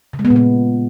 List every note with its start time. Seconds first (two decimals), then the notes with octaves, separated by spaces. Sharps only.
0.13 C#3
0.19 G#3
0.25 B3
0.30 A#2
0.36 B3